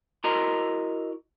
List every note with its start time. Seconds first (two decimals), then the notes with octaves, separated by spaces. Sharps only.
0.24 E4 F#4 A#4 D#5 A#5 C6